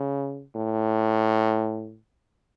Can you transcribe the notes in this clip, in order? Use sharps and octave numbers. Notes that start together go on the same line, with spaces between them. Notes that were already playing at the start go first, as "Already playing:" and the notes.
Already playing: C#3
A2